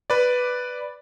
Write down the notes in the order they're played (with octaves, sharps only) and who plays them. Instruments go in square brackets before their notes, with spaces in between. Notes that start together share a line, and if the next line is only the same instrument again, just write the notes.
[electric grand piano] B4 D5